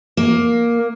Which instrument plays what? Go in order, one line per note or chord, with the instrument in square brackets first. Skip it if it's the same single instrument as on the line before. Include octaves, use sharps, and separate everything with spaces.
[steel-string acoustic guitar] A#3